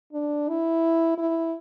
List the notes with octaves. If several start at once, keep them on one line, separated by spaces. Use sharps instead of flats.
D4
E4
E4